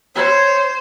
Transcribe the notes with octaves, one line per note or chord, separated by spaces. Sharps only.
C5 C#5